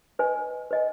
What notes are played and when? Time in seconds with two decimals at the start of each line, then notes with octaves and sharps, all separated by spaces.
0.19 B4 D#5 G#5
0.71 B4 D#5 G#5